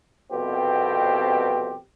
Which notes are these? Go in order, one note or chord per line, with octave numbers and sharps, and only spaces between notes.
C2 F2 B2 B3 C4 G4